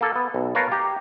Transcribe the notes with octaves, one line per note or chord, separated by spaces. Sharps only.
A#3 A4
B3
B1
A#4 B4 C#5 F5 A5 A#5
G4 A#5